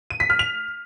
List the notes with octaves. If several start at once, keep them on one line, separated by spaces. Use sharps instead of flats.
D#7
B6
F6
F7